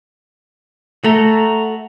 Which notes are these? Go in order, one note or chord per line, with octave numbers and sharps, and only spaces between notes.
A3 F#4 A4 A#5